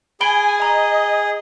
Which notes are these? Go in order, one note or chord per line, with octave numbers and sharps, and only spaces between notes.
G#4 G#5 B5 D7 G7
D#5 A#5